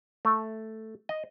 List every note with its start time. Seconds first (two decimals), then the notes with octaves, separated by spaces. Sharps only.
0.25 A3
1.09 D#5